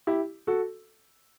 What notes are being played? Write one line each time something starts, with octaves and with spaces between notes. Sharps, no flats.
E4 G4
F#4 A4